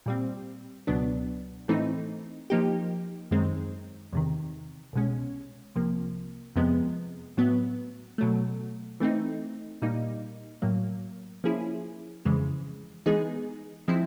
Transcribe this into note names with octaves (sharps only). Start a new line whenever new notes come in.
A#2 G3 C4
C#2 B2 F#3 B3 D4
A2 E3 A3 C4 D#4
F3 A#3 D#4 G4
F#2 D#3 G#3 C4
E2 C3 D#3
C2 B2 G#3 C#4
C2 C3 F3 A#3
F2 C3 F3 G#3 B3
A2 F#3 B3
B2 F#3 A3
E3 A3 C4 D#4
A#2 G3 A#3 D#4
A2 F#3 A#3
F3 A#3 C#4 E4 G#4
F2 C#3 E3 G#3
E3 G#3 B3 D#4 G#4
F3 G#3 C4 E4